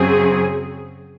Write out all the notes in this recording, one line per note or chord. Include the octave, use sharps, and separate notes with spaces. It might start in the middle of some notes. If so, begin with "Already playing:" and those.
Already playing: F#2 C#3 F#3 C4 G#4